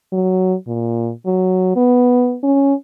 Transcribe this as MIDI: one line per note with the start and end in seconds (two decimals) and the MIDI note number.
0.12 0.55 54
0.67 1.11 46
1.26 1.72 54
1.76 2.37 59
2.43 2.74 61